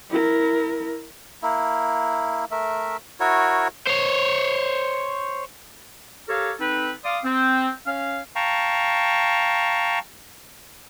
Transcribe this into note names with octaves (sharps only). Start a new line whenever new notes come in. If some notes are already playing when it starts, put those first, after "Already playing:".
E4 A#4
A#3 E4
A3 A#4 E5
E4 F#4 A#4 C#5
C5 C#5
G4 A4 A#4 C#5 F5
C4 D#4 A4 B4
D5 F5 C6 D6 D#6
C4
C#4 C#5 F5
F5 G5 A5 A#5 C#6